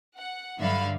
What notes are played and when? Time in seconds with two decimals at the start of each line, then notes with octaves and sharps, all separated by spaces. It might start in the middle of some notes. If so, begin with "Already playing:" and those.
0.18 F#5
0.60 G2 D3 F#3 E5 F5 B5